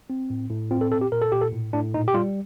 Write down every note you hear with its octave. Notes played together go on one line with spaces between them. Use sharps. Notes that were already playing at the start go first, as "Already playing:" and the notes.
C4
A2
A2
C4 F4
A4
A#2 A4
G4
A#2 A#4
A4
A#2 G4
A4
A2
A2 D4
A#2 D#4
G4
G3 F4